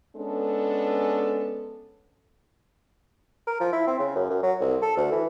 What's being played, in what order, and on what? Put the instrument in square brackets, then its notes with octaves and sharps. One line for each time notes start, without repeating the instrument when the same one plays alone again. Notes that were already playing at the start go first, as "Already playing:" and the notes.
[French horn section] G#3 B3 C#4 D4 A4
[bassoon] A#4
F3
E4
C4
C#3
F#2
F#2
F#3
C2
A4
D2
E3